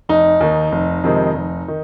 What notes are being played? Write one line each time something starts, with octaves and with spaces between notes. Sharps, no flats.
F1 D#4
D#2 D#3
F1
F2 C3 D#3 G#3
F1
D#3